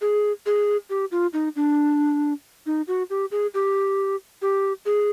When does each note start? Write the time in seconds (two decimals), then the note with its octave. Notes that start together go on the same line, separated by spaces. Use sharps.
0.01 G#4
0.46 G#4
0.90 G4
1.12 F4
1.33 D#4
1.56 D4
2.66 D#4
2.88 F#4
3.10 G4
3.31 G#4
3.54 G4
4.42 G4
4.86 G#4